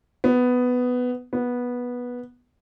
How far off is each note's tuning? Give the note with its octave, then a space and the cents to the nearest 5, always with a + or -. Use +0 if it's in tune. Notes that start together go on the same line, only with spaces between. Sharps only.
B3 +10
B3 -10